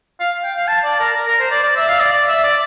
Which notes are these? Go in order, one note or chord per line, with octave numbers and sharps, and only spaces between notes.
F5
G5
F5
A5
D5
A#4
A#4
A#4
C5
D5
D5
E5
F5
D5
D5
E5
D5